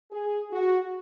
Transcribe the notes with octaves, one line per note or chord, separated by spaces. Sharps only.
G#4
F#4